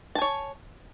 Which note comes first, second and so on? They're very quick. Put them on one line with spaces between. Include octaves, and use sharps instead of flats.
A5 G#5 C#5